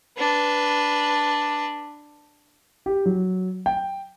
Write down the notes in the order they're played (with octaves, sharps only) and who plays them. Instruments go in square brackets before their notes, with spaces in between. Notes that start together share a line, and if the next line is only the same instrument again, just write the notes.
[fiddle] D4 B4
[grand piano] G4
F#3
G5